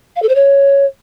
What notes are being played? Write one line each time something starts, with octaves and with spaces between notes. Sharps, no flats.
F5
A4
C5
C#5